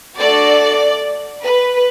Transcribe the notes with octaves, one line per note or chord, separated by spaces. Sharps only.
A3 D4 F#4 A4 D5
B4